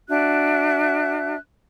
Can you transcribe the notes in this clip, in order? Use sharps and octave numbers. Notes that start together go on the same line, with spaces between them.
D4 F#4 E5 F#6